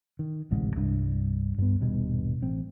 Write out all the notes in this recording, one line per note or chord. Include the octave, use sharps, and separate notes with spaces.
D#3
A1 D2 G#2 C3
C2 G2 D4
G2 B3
D#1 G2 B2
A1 C4